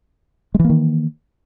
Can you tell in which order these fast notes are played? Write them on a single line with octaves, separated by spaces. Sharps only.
G#3 E3 A#3 D#3